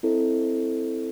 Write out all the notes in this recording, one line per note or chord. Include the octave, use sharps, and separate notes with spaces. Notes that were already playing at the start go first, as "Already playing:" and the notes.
C4 E4 A4 C5 D#5